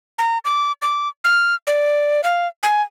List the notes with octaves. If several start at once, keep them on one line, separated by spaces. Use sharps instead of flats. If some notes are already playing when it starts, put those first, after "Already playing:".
A#5
D6
D6
F6
D5
F5
G#5